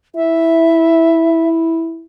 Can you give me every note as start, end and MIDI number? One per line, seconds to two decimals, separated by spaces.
0.16 2.06 64
0.16 1.48 76